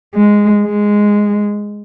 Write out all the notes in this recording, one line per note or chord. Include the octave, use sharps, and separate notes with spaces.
G#3
G#3